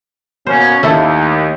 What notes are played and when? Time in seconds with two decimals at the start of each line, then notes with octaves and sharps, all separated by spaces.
0.47 B2 A#3 C#4 C5
0.83 D#2 A3 E4 A4